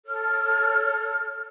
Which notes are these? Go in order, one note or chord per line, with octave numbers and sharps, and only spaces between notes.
A4 C#5 F6